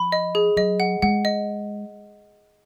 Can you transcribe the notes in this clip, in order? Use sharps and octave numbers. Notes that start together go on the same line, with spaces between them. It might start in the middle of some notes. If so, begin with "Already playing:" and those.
Already playing: F3 B5
D#5
G#4
F#3 D#5
F#5
G#3 F#5
D#5